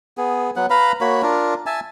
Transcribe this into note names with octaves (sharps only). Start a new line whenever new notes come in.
B3 G#4
F#3 B3 F#5
B4 F5 A#5 B5
A#3 F#4 C#5 B5
D4 F4 A#4
E5 G#5 A5